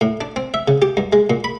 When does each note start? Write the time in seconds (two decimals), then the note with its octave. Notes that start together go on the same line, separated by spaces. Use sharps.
0.01 A2
0.21 D4
0.36 C4
0.54 E5
0.68 C#3
0.82 G4
0.97 G2
1.13 G#3
1.30 A#2
1.44 B5